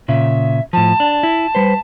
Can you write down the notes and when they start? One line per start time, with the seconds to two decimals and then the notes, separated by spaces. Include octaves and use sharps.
0.08 A#2 C#3 E5
0.73 A2 F3 A5
1.00 D4
1.23 E4
1.55 G3 B4 C5